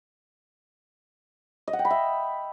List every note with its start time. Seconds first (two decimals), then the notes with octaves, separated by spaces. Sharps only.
1.67 D#5
1.73 F#5
1.79 G5
1.85 B5
1.90 E5